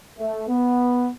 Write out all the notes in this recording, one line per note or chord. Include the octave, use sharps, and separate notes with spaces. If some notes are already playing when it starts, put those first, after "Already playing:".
A3
B3